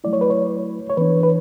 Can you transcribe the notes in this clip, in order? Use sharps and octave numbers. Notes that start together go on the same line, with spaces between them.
F#3 A3 E4 D5
C#5
B4
C#5
C#5
E3 B3 D4 B4
B4